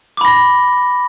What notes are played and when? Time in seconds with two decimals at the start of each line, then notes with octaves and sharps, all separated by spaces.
0.17 D6
0.21 B5
0.25 A#6